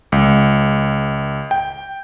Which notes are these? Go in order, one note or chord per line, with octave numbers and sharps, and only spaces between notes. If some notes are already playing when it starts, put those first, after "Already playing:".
C#2
G5